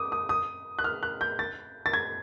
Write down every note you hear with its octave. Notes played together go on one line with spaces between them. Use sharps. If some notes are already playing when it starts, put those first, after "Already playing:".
Already playing: D6 D#6
D#6
D#6
F#6
F6
F#6
G6
A6
A6
G#6